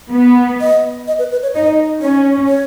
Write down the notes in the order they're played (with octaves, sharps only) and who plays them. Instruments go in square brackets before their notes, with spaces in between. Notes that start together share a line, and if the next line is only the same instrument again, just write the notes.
[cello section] B3
[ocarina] D#5
D#5
B4
B4
C#5
[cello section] D#4 [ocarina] D#5
[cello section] C#4 [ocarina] C#5
[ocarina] C#5